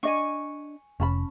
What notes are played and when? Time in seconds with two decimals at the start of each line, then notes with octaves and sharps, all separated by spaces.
0.03 D4 D#5 G#5 C#6
1.00 F1 C#4 A5 B5